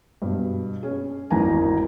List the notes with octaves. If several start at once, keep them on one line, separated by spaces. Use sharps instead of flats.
G2 B2
C#4 G#4
G#1 E2 D#3 E3 G#5 A#5